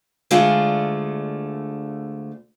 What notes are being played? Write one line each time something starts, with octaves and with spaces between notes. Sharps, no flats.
D2 D3 G#3 A3 F4 F5